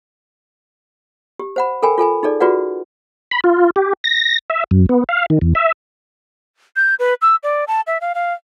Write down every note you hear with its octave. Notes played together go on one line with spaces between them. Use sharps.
G4
C5 F#5 B5
A4 A#4 G5 G#5 B5
F4 A4 G#5 B5
D#4 G#4 A4 D5
F4 F#4 G#4 B4 D5 F#5
B5
F4
G4
A#6
E5
F#2
B3
F5
D#3
E2
E5
G6
B4
E6
D5
A5
E5
F5
F5